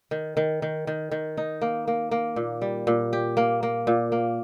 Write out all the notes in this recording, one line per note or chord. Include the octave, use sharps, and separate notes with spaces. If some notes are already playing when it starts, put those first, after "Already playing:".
D#3
D#3
D#3
D#3
D#3
D#4
A#3
A#3
A#3
A#2
G3
A#2
G4
A#3
A#3
A#2
A#3